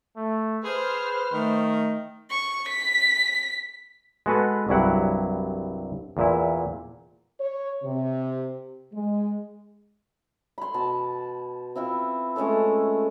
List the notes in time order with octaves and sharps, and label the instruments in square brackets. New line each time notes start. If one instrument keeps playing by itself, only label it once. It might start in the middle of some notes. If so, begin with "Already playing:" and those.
[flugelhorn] A3
[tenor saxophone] G#4 [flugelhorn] B4 [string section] C5 F6
[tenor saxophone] D#3 [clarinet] A3
[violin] C#6
B6
[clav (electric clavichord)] G#3 B3 F#4 A4 B4
C2 G2 F#3 E4 F#5
E2 A#2 E4
[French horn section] C#5
C3
G#3
[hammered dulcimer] B5 C6
B2 A5
C4 E4 F4 E5
G#3 A3 C#4 A4